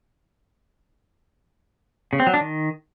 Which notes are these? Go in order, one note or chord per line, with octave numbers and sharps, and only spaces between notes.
C#3
C4
F#3
D4
D#3